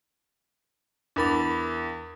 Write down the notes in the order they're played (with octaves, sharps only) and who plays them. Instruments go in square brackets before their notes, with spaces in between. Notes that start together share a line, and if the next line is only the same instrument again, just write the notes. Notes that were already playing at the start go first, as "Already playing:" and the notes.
[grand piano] E2 B5 [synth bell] D4 A#4 A6